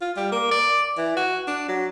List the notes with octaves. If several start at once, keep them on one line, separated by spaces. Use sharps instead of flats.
F4
G3
A#3
D5
E3
F#4
D4
F#3